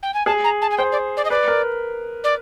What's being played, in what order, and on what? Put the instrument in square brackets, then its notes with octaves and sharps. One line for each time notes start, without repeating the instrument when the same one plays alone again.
[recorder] G5
G#5
[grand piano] G#4 [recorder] A5
[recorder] A#5
A5
G#5
[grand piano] C5 [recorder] G5
[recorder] D5
D5
D#5
[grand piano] B4 [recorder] D5
[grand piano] A#4
[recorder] D5